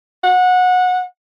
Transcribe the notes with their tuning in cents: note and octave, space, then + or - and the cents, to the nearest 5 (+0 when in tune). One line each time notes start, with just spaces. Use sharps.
F#5 -20